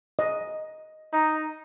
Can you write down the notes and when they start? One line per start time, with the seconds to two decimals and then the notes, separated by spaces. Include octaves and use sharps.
0.19 D#5
1.12 D#4 A#5